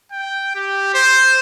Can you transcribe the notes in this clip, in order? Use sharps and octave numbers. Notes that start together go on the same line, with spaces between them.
G5
G4
C5